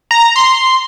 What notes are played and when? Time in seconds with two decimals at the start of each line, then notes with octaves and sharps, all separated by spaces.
0.11 A#5
0.36 C6